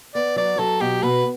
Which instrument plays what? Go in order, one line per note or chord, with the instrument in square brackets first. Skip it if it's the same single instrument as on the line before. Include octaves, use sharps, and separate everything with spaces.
[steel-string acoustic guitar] B3 [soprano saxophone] D5
[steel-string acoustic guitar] F#3 [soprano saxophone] D5
[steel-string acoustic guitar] F#3 [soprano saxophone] A4
[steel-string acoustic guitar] B2 [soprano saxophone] G4
[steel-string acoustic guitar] B2 [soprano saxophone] B4